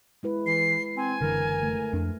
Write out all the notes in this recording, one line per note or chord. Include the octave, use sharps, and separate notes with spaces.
G#3 E4 B4
E3 C7
C4 G#5
F#1 D3 E3 A#4
A3
F2 D4